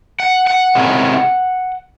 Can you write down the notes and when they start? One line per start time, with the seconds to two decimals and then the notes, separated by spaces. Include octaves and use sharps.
0.20 F#5
0.47 F#5
0.75 C3 D#3 G#3 C#4 E4